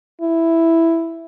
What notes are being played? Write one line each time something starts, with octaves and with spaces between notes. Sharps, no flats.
E4